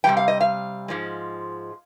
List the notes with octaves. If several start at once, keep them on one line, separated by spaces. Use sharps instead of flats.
C3 G3 B3 G5
F5
D#5
F5
G#2 F3 G#3